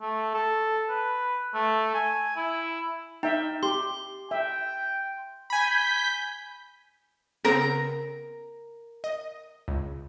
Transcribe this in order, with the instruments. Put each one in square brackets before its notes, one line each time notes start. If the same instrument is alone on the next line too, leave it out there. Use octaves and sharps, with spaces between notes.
[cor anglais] A3
A4
B4
A3
G#5
E4
[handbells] D#4 [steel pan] E5 G5
[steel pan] G4 [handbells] C6
[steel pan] E5 [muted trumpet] G5
[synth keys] G#5 B5 [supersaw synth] G6 B6
[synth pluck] C#3 B3 C4 [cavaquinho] A#4 A#5
[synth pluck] D#5
C#2